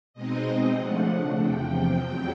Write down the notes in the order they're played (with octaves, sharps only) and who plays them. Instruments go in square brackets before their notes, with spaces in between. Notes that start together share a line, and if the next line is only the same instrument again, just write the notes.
[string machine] B2 G#3 C4 D#4 D#5
C#3 F3 A3 D4 F#5
E2 C3 F3 G5
F2 C#3 F#3